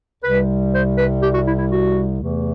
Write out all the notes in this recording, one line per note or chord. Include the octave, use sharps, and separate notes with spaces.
C2 C3 G3 B4
C5
B4
G4
F#4
E4
E4
F#4
E2 C3 E3 A3